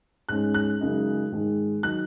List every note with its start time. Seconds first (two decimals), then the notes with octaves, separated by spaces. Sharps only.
0.29 G#2 G#3 C#4 F#6
0.54 F#6
0.81 F#2 C#3 G#3 D#4
1.32 G#2 D#3 G#3
1.83 D#3 F#3 D#4 F#6